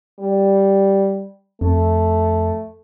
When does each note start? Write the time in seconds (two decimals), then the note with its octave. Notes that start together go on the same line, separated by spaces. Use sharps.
0.20 G3
1.61 F2 A3